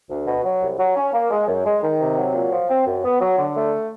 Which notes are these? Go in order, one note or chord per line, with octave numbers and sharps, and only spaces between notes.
D2
B2
F#3
C2
F#3
C#4
A#3
G#3
F#2
G#3
D#3
C3
F#3
A#2
F3
C4
F#2
B3
F#3
D3
A3